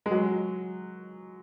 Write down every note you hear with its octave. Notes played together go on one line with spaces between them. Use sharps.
G#3
F#3